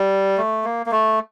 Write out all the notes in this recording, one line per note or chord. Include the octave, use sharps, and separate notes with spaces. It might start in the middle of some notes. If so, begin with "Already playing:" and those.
Already playing: G3
A3
A#3
A#3
A3